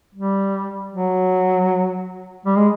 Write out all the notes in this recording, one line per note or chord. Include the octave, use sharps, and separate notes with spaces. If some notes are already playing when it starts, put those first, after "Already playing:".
G3
F#3
G3
G#3